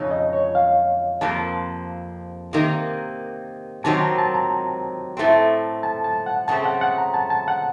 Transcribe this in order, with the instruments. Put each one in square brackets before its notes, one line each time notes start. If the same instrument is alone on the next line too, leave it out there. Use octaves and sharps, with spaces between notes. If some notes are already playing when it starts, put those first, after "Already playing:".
Already playing: [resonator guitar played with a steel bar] F2 C#3 D#4 [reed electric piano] C#5
[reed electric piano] D#5
C#5
F5
[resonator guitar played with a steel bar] F2 C3 F3 A#3 [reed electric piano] A5
[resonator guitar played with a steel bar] C3 D#3 A#3
[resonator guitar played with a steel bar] C3 D#3 F#3 C4 [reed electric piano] A5
[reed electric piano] A#5
A5
A#5
[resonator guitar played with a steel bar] A2 A3 C4
[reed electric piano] A5
A5
F#5
[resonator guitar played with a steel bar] C#3 A3 C4 [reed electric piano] A5
[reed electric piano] F#5
F#5
A#5
A5
A5
F#5